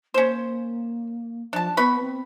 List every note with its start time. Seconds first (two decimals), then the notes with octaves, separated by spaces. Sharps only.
0.14 A#3 C#4 C5
1.53 F3 D4 A5
1.77 B3 B4 B5 C#6
2.01 C4